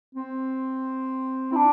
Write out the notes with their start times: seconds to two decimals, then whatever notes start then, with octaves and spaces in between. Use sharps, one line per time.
0.15 C4
1.52 E4
1.56 D4